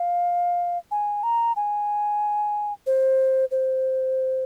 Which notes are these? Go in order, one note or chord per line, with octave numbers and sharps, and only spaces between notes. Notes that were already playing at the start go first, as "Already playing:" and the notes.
Already playing: F5
G#5
A#5
G#5
C5
C5